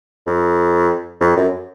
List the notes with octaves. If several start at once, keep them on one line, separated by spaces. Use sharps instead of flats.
F2
F2
F#2